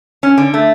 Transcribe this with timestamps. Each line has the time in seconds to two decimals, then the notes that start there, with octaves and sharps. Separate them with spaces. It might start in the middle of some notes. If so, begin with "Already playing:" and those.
0.23 C#4
0.38 D3
0.54 A3